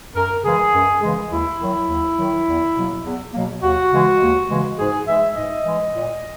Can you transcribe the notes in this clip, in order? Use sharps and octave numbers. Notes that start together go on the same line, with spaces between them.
F#2 A#4
C#3 E3 G#3 G#4
F#2
C#3 E3 G#3
D#2 E4
D#3 F#3
D#2
D#3 F#3
E2
B2 F#3 A#3
E2
B2 F#3 A#3
D#2 F#4
C#3 E3 G#3
D#2
C#3 E3 G#3
G#2 G#4
E3 G#3 E5
G#2 D#5
E3 G#3
A#2